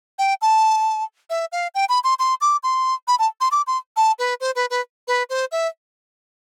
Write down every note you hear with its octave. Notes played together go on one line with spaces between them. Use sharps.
G5
A5
E5
F5
G5
B5
C6
C6
D6
C6
B5
A5
C6
D6
C6
A5
B4
C5
B4
B4
B4
C5
E5